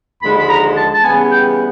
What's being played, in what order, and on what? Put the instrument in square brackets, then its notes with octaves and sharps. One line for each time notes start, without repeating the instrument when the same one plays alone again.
[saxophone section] D#2 D3 F3 G#3 [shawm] B5
[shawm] B5
A#5
A5
A5
[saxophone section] C#3 E3 G3 B3 [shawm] G#5
[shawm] G5